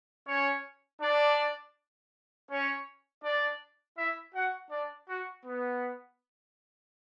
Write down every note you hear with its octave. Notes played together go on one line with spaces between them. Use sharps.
C#4 C#5
D4 D5
C#4 C#5
D4 D5
E4 E5
F#4 F#5
D4 D5
F#4
B3